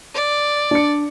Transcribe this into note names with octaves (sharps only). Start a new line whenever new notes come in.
D5
D4 C#7